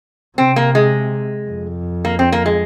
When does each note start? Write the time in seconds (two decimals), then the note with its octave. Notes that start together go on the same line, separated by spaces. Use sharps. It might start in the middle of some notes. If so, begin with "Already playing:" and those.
0.38 C3 C4
0.56 A#3
0.75 G#3
1.49 F2
2.05 A#3
2.19 C4
2.32 A#3
2.46 G#3